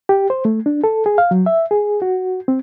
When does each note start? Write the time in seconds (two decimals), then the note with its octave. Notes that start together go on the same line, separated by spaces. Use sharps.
0.09 G4
0.30 C5
0.45 A3
0.66 D4
0.84 A4
1.06 G#4
1.18 F5
1.31 F#3
1.46 E5
1.71 G#4
2.02 F#4
2.48 C4